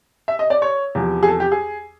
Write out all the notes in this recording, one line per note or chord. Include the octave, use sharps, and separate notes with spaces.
E5
D#5
D5
C#5
E2 C3 F3
G#4
A4
G4
G#4